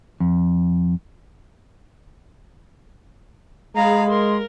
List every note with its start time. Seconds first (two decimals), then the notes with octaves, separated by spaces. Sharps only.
0.20 F2
3.75 G#3 G#4 F5 A#5 B5
4.09 A#4 C6